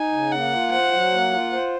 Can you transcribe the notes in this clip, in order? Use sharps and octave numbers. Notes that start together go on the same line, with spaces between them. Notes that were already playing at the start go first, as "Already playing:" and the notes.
Already playing: D#4 G#5
C#3
A#3 F#5
F4
C5 F#5
F#3
A#3
F4
C5